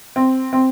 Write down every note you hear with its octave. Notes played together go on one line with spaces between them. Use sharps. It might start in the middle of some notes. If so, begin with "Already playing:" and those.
C4
C4